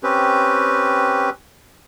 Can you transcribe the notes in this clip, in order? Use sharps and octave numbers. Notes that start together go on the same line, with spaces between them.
C4 C#4 G4 B4